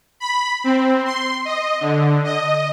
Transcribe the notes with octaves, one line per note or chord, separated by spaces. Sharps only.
B5
C4
C6
D#5
D3
D#5